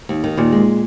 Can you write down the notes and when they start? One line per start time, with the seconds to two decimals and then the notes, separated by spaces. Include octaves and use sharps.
0.09 D#2
0.24 D#3
0.37 D#2 A#2
0.52 G#3